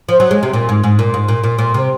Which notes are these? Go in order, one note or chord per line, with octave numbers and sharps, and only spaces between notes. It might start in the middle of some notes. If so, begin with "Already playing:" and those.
F3
F#3
G#3
C3
A#2
G#2
G#2
A#2
G#2
A#2
A#2
A#2
C3